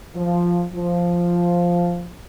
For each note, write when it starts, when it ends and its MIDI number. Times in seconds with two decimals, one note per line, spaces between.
0.16 0.64 53
0.73 2.11 53